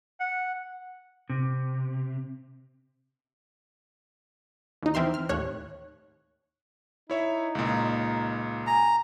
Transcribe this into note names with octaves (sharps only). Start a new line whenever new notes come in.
F#5
C3
D#2 D#4
E3 C4 E5 C6 F6
F6
D#2 A2 C#5 F#6
D#4 E4 C#5 E5
C#2 A#2
G#5 A#5